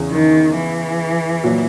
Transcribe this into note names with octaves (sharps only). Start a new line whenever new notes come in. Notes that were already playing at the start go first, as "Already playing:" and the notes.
Already playing: E2 C#3 E3
D#3
E3
A#2 F#3